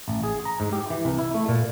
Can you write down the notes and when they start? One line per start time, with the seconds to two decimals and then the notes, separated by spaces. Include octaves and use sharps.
0.08 A1
0.23 G#4
0.45 A#5
0.60 G#2
0.73 G4
0.90 E3
1.05 C2
1.18 E4
1.35 A3
1.48 A#2